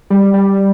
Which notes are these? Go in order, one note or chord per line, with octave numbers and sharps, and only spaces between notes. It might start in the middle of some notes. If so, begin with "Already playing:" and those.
G3
G3